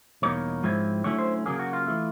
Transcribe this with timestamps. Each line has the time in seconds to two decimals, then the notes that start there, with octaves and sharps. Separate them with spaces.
0.22 E2 B2 G3 A#3 D#4 C#5
0.63 G#2 F3 G#3 C4 E4
1.04 D3 F#3 A3 C#4 E4 C#5
1.19 C5
1.46 C#3 F#3 A#3 G#4
1.59 F#4
1.73 F4
1.87 E3 A3